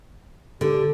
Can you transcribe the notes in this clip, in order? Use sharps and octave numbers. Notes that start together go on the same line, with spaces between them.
D3 G4